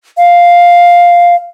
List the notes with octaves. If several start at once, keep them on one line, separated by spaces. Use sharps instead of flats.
F5